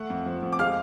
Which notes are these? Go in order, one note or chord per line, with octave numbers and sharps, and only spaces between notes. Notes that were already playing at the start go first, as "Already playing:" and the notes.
Already playing: A3 F#5
F2
F3
F2
D6
G#3 F5 F6